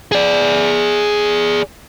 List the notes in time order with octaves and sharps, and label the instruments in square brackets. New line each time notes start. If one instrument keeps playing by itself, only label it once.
[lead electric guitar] G#4 D5